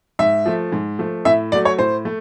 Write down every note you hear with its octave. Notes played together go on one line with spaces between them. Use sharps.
G#2 E5
F3 A3
G#2
F3 A3
A2 E5
F#3 A3 D5
C#5
A2 C5
A3